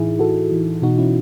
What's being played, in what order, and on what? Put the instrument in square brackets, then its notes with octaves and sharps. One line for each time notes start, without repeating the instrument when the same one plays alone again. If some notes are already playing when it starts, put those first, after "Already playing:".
Already playing: [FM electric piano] A2 E3 D#4 E4 G#4
E3 F#4 A4
E3
B2 D#4 F#4
C#4 E4